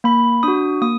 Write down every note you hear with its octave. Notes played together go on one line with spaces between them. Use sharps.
A#3 B5
D4 F#4 D#6
A#3 D#6